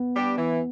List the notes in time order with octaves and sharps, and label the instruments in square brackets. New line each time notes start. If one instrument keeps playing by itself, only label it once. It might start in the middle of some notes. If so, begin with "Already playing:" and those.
Already playing: [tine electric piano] B3
[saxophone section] G3 D4 G4
E3